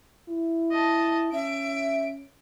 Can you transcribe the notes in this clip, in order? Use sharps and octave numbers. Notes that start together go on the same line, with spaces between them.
E4
D#5 A5
C#4 E5 D7